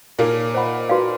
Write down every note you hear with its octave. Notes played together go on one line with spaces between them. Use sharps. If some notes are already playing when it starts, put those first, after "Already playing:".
A#2 A#3 D#4 G#4 C#5
C5 D#5 F#5 B5
D#4 F#4 B4 D5 F5